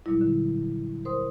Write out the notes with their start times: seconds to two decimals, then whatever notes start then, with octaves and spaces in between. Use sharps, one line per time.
0.06 A#2 F#3 G3 E4
0.21 D3
1.05 A#4 C5 C6 D#6